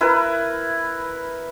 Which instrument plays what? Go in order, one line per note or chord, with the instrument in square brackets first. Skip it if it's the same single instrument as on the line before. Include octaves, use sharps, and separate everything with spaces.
[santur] E4 A#4 B4